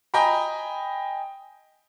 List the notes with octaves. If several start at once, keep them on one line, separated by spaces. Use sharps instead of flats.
D#5 G5 G#5 A#5 B5